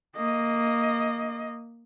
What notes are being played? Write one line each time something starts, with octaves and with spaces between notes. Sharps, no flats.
A#3 D#5